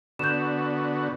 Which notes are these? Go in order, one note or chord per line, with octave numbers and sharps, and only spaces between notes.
D3 B3 F#4 G6 E7